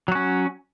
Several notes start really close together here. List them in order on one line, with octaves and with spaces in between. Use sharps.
F#3 F#4 C#4